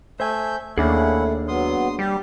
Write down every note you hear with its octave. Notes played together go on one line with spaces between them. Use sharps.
A3 C5 E5 G#5 G6
D#2 A3 A#3 C#4 D4 E4 G#4 F#5
F#3 B3 C6 D#6
G3 G4